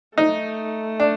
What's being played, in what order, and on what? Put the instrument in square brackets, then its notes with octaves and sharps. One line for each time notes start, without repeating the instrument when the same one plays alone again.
[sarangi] A3 [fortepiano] D#4
[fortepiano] D4